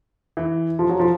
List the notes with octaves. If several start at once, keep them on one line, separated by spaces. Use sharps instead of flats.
E3
F3
F#3
F3